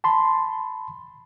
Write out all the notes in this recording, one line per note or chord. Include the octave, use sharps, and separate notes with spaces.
A5 B5 C6